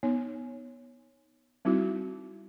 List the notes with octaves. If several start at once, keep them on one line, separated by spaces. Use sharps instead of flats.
B3 D#4 C#5
G3 C4 D#4 E4 F#4